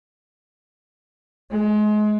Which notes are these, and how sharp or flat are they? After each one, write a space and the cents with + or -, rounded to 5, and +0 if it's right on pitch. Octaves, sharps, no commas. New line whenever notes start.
G#3 +30